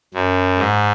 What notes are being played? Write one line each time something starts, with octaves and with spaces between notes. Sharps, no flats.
F#2
G#2